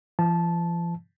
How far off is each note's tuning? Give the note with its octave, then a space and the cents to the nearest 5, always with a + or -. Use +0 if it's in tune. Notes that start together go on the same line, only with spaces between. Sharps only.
F3 -45 A5 -15